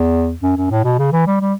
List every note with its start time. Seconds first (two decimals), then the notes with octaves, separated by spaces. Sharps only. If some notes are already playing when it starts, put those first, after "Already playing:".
Already playing: E2
0.43 F#2
0.57 F#2
0.71 A2
0.84 B2
0.98 C#3
1.12 E3
1.27 G3
1.41 G3